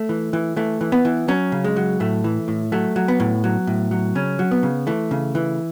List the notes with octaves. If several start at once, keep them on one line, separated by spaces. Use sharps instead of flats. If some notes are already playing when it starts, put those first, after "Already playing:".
Already playing: A3
E3
E3
E3 A3
E3
B3
E3
F#3 C#4
C#3
G#3
F#3
A2 A3
E3
A2
F#3 A3
F#3
B3
A2
F#3
A2
F#3
C#3 C#4
F#3
B3
C#3
E3 A3
C#3
E3